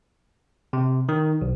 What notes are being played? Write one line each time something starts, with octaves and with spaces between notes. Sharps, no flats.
C3
D#3
B1